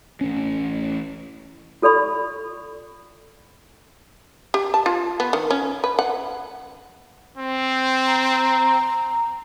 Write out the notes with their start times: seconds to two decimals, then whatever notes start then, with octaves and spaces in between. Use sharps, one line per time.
0.21 A1 C#4
1.82 F4 A4 D5 B5 C#6
4.54 G4
4.74 A5
4.86 F4
5.20 B3
5.33 D#3
5.51 C#4
5.84 B4
5.99 F#5
7.37 C4
8.07 A#5